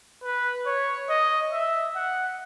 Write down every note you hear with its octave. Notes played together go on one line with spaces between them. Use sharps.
B4
C#5
D#5
E5
F#5